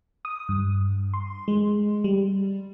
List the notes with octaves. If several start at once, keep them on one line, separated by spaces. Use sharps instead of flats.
D#6
G2
C6
G#3
G3